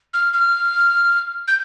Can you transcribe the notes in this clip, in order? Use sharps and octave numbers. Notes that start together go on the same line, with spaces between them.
F6
F6
G6